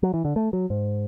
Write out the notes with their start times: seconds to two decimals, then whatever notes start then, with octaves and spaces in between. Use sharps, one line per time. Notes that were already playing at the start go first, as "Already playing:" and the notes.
0.03 F#3
0.14 E3
0.25 D3
0.36 A3
0.53 F#3
0.70 G#2